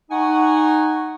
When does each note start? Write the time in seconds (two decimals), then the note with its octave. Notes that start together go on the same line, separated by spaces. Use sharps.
0.10 D#4 F#5 G#5 C#6